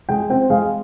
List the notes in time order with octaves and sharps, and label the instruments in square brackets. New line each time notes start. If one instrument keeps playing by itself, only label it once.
[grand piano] G#3 G5
C4 G5
G#3 F5